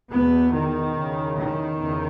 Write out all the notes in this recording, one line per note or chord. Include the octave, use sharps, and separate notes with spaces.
E2 B2 B3
D#3
E2 C#3
D#3
E2 C#3